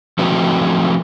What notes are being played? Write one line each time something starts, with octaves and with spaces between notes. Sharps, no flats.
F3 A3 C4 D#4 F#4 B4